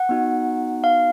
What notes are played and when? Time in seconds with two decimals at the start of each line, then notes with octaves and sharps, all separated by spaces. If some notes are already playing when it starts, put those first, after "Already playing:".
Already playing: F#5
0.09 B3 D#4 F#4
0.84 F5